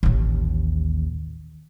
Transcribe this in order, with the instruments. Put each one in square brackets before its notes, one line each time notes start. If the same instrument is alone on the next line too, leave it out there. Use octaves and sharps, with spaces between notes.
[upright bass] A1 D#2